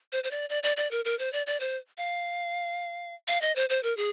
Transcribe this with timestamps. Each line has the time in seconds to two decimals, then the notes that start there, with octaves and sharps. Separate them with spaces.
0.12 C5
0.24 C5
0.31 D5
0.50 D5
0.63 D5
0.77 D5
0.91 A#4
1.05 A#4
1.19 C5
1.33 D5
1.47 D5
1.60 C5
1.98 F5
3.28 F5
3.41 D#5
3.56 C5
3.69 C5
3.83 A#4
3.97 G#4